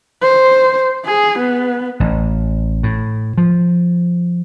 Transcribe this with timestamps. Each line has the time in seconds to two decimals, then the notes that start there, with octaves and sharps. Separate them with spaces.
0.22 C5
1.06 G#4
1.39 B3
2.00 A1
2.83 A2
3.38 F3